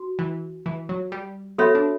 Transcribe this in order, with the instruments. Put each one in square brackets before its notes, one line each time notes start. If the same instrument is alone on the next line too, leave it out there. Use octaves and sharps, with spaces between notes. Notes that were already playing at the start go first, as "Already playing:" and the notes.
Already playing: [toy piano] F#4
[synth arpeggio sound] E3
E3
F#3
G3
[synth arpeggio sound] B3 [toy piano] F#4 A4 C#5 E5 B5
[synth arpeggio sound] D4